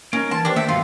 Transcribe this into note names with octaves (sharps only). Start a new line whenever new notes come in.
A#3 C#4 D#4 A#4
E3 A#3 A5 C6
D#3 D4 G4 B4 C5
A3 E5 G5
G2 B2 F#3 F4